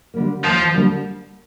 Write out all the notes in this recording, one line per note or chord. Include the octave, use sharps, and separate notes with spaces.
D3 G3 A#3
D#2 F3
D3 G3 A#3